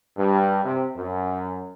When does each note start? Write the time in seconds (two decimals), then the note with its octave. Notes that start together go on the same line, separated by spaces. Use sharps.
0.17 G2
0.64 C3
0.96 F#2